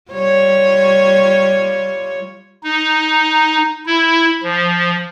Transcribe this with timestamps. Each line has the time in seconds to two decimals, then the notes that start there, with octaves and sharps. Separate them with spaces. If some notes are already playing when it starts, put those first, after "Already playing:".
0.12 G3 F4 C#5
2.63 D#4
3.86 E4
4.43 F3